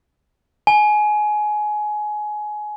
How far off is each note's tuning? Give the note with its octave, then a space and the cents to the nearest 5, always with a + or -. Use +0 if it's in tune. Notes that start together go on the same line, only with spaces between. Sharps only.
G#5 +20